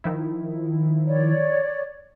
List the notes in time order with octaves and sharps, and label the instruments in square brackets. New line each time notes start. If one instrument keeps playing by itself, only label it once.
[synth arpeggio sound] D#3 F3 E4
[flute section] C#5 D5